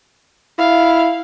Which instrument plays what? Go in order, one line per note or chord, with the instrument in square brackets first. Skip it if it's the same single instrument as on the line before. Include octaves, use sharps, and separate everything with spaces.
[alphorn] E4 [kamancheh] F5